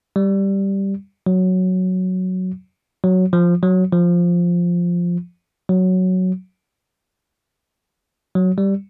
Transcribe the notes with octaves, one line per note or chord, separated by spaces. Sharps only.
G3
F#3
F#3
F3
F#3
F3
F#3
F#3
G3